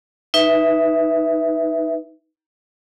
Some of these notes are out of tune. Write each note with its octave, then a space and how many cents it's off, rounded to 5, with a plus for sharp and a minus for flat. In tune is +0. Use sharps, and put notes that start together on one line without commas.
D#4 +5 B4 +0 E5 +0